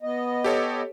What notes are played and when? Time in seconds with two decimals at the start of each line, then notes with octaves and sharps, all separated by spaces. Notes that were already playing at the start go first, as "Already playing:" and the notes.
0.03 B3 D#5
0.44 G4 A4 C#5